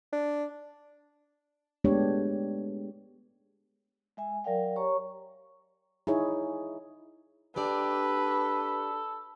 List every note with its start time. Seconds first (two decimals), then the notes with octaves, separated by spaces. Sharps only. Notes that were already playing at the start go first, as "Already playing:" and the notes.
0.13 D4
1.84 G#3 A3 B3 D4 G4 C#5
4.17 G#3 E5 G#5
4.44 F#3 A#4 D5 F5 G5
4.76 G4 C#5 A#5 C#6
6.07 D#4 E4 G#4 C#5
7.56 D4 G4 A4 B4 D5